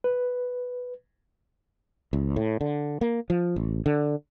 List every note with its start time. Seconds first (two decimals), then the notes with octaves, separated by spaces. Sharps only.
0.04 B4
2.13 C#2
2.36 A2
2.61 D3
3.01 A#3
3.30 F3
3.56 A1
3.86 D3